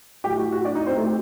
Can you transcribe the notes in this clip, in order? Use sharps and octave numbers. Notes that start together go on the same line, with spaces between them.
A2 F#3 A3 G4
F#4
F#4
D4 D5
D#4 D#5
C4 C5
A3 A4
G4